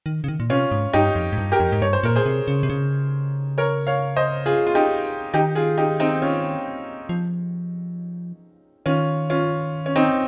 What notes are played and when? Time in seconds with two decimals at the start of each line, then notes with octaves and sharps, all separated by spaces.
0.06 D#3
0.24 C#3
0.28 D#3
0.40 A#2
0.50 C3 C#4 F4
0.71 G#2
0.93 G2 D#4 G4
1.15 F2
1.32 G#2
1.38 G2
1.52 G4 A#4
1.60 F2
1.72 G#2
1.82 G2 C#5
1.93 C5
2.03 A#2 A#4
2.16 G#4 C5
2.26 C3
2.48 C#3
2.63 C3
2.70 C#3
3.58 A#4 C#5
3.87 C#5 F5
4.16 C5 D#5
4.46 F4 G#4
4.67 F4
4.75 D#4 G4
5.34 D#3 D#4 G4
5.55 F4 G#4
5.78 D#4 G4
6.00 C4 D#4
6.22 C#4 F4
7.09 F3
8.86 D#3 C#4 F4
9.30 C#4 F4
9.86 C#4
9.96 C4 D#4